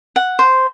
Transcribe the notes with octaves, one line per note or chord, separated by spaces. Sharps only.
F#5
C5